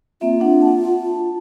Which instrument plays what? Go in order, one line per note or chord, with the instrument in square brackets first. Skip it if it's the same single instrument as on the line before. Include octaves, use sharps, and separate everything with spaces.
[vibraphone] A#3 C4 E5 [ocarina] F4
[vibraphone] D4 F#5
A5